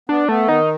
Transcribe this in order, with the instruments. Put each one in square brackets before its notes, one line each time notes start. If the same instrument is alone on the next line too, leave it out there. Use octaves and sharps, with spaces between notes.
[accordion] B3 [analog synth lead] D4
[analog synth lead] A3 [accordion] B3
[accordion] D#3 [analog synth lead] D#4